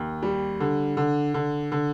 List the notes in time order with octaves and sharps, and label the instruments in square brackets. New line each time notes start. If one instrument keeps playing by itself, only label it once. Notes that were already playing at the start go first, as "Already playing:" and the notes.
Already playing: [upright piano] D#2
G3
D3
D3
D3
D3